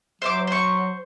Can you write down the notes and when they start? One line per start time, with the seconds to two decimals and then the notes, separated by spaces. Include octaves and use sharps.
0.22 F#3 C5 E5 D6
0.47 C5 C#6